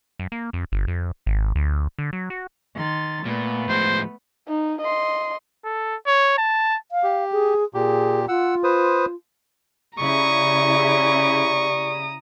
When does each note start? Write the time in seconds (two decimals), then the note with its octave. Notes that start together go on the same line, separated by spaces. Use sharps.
0.19 F#2
0.32 A#3
0.53 F2
0.72 G1
0.87 F2
1.26 G#1
1.55 D2
1.99 D3
2.13 F#3
2.30 F#4
2.74 D#3 C6 A6
3.25 A#2 A3 B3
3.69 A2 F3 G#3 C5
4.48 D#4
4.81 D#5 C6
5.65 A4
6.07 C#5
6.38 A5
6.92 F5
7.03 G4
7.32 G#4
7.74 A#2 G4 G#4
8.28 F4 F#5 E6
8.64 B4 C5 D#6
9.99 C#3 E4 G4 D5 A#5 C#6 D#6